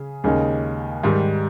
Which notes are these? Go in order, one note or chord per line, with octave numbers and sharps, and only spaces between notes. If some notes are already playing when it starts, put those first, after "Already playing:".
Already playing: C#3 G#4
D#2 C#3 G#3 D#4
G#2 D#3 G3